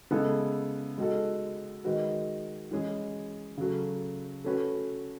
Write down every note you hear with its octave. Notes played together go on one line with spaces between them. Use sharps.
C#3 G#3 B3 E4 A4
G#3 D#4 F#4 A4
D#3 G#3 D#4 F#4 B4
E3 G#3 C#4 G#4
C#3 F#3 A3
A3 C#4 F#4 B4